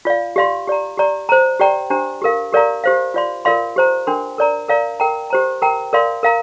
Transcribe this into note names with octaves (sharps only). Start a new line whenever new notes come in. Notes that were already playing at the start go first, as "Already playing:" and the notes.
F4 D5 F5
G4 D5 F5 C6
G4 D5 A#5
G4 D5 A#5
C5 A#5
G4 D5 G5 A#5
D4 G4 C5 A#5
G4 A#4 F5
G4 A#4 D5 F5 A#5
G4 C5 F5
F4 D5 F5 C6
F4 A#4 D5 F5 C6
G4 C5 A#5
D4 A#4 G5 C6
A#4 D5 A#5
A#4 D5 F5 A#5
A#4 G5 A#5
G4 C5 A#5
A#4 G5 A#5
A#4 D5 F5 C6
A#4 F5 A#5